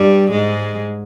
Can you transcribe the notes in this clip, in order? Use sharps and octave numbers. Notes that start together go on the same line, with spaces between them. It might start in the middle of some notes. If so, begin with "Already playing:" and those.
Already playing: G2 G3
G#2 G#3